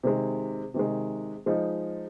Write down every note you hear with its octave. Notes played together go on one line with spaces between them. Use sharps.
C3 D#3 G#3
C3 D#3 G#3
F3 G#3 D#4